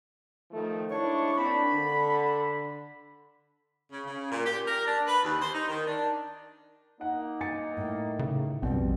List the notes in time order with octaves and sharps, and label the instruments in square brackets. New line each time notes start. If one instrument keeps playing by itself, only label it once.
[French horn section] D#3 F3 A3
[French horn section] G#2 D4 E4 [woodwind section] C#5 C#6
[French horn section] A#3 C4 D4 [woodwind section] B5
[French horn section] D3
[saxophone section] C#3
C#3
A#2
G4
A#4
D4
B4
D#2
C5
D#4
D#3
D4
[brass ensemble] A#3 D#4 [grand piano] F#5
[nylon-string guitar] G#5 [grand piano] A6 C#7
[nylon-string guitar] A2
[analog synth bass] C#3
[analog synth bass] A#1 [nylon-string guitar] F2 G3 C4 [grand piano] B2